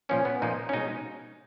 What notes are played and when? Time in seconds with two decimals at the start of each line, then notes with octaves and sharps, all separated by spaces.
0.09 A#2 F3 A#3 C#4
0.25 B3
0.42 A#2 F3 A#3 D#4
0.69 C#4
0.73 B2 G#3 D#4